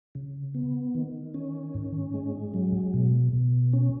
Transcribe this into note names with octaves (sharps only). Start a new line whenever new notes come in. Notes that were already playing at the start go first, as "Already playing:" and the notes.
C#3
B3
D#3
C#4
G#2
G#3
F#3
B2
B2
C#4